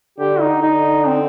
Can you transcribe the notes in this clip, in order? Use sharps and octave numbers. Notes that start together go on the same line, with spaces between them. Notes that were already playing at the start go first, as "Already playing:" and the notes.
D3 G4
D#4
D3 D#4
C4